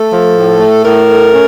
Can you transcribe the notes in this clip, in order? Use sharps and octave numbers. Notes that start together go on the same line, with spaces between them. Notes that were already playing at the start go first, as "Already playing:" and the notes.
Already playing: A3 A4
F3
A2
A3
A2 A#4
A3
C#4